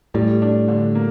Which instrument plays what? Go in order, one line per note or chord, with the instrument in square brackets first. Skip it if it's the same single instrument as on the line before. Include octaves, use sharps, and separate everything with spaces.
[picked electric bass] A2 [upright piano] G3
[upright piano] D4
D3
A#3